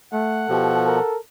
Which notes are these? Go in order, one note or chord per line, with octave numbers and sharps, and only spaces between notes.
A3 F#5
B2 F3 G4 A4
A#4